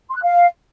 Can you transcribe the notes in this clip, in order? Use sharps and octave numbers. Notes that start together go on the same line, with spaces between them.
C6
F#6
F5